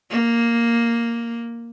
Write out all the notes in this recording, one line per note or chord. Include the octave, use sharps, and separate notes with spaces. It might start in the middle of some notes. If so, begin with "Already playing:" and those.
A#3